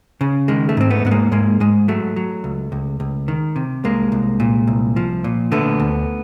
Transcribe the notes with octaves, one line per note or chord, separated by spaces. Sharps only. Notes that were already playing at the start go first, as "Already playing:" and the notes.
C#3
D#3 G#3
A3
G#2 C4
A3 B3
G#2 B3
G#3 A#3
G#2 G#3 A#3
G#2 G#3
F#3 A3
F#3
C#2
C#2
C#2
D#3
C3
C2 G#3 A#3
C2
A#2
C2
F3
A#2
D3 A3 B3
D2